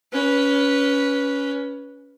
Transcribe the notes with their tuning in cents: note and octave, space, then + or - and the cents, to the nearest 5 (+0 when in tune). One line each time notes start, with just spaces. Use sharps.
C#4 +15 B4 -10